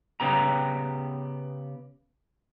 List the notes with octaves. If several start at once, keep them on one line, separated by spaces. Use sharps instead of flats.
C#3 B3 G4 A#5